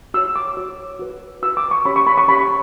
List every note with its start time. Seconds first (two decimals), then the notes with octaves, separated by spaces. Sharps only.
0.14 F#4 E6
0.17 C#5
0.36 D6
0.57 F#4 C#5
0.99 F#4 B4
1.43 F#4 B4 E6
1.57 D6
1.71 C#6
1.85 C#4 G4 C#5 B5
1.96 C#6
2.07 B5
2.18 C#6
2.28 C#4 G4 C#5 B5
2.39 C#6